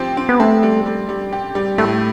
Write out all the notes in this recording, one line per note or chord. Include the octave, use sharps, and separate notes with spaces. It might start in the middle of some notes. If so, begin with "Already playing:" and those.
Already playing: F3 C4 G4
C4
B3
A3 C4
G3
G3
G3
G4
G3
A2 A3